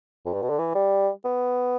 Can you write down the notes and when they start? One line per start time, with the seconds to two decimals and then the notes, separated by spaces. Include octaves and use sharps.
0.25 F2
0.33 G2
0.42 B2
0.50 D3
0.58 E3
0.75 G3
1.25 B3